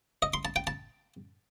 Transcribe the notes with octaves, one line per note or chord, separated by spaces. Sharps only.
D#5
C6
A5
G5
A5